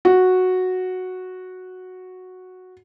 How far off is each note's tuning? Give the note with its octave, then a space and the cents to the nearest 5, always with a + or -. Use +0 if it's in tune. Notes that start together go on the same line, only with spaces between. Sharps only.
F#4 -5